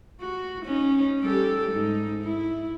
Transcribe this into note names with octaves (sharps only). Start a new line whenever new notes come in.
F#4
C#4 D#4
G3 G4 A4
G#2 D#4
E4